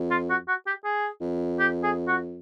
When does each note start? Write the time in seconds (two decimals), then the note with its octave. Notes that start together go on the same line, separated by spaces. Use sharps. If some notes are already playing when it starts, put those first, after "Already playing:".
Already playing: F2
0.10 F4
0.30 F#4
0.48 F#4
0.67 G4
0.84 G#4
1.21 F2
1.59 G4
1.83 G#4
2.08 F#4